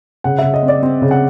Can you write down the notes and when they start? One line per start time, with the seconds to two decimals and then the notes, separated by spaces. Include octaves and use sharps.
0.24 C#3 F#5
0.39 C#3 E5
0.54 D#5
0.63 C4
0.68 D5
0.83 C4
1.02 C#3
1.11 F#5